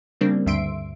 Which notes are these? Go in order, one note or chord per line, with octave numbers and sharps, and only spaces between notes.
C#3 G3 A#3 C4 D4
D2 G2 E5 C6 D7